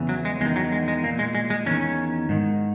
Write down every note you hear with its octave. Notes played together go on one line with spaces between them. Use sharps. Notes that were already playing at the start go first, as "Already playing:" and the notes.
Already playing: E2 C#3 E3
F#3
G#3
E2 D#3 G#3
F#3
G#3
G#3
A#2 A#3
G#3
G#3
G#3
E2 D#3 C#4
G#2 D#3